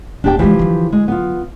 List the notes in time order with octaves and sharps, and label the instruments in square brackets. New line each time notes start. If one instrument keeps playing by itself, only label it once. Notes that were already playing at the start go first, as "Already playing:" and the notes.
[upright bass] D1 B3 [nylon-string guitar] D4 G4 G5
[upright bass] D3 G#3 [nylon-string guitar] E3 F3 G4
[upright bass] D3 F#3
[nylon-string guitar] G#3
B3 F4